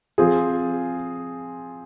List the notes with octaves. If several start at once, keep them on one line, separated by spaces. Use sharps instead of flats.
F3 C4 F4 G#4